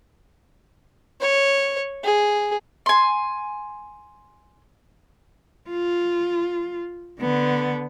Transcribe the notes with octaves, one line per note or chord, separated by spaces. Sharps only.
C#5
G#4
G#5 C6
F4
D3 B3